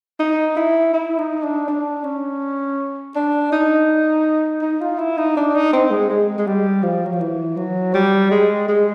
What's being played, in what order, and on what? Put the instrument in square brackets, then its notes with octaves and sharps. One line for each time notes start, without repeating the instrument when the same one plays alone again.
[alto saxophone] D#4
E4
E4
D#4
D4
D4
C#4
D4
D#4
D#4
F4
E4
D#4
D4
D#4
C4
G#3
G#3
G#3
G3
F3
F#3
F3
E3
F#3
G3
G#3
G#3